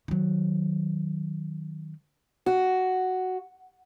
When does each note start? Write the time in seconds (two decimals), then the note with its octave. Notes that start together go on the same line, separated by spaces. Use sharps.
0.08 D#3 F#3
2.46 F#4